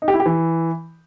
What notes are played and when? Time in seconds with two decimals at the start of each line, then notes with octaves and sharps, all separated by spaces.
0.02 D#4
0.08 G4
0.14 E4
0.20 G4
0.26 E3